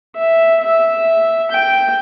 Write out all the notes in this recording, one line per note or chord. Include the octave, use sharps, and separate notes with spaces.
E5
E5
G5